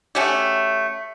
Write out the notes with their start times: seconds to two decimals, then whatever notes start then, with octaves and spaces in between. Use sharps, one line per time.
0.15 A3 C#4 F#4 G4